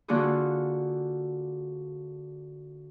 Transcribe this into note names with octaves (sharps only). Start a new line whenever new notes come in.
D3 A#3 D4 F4 F#4 G#4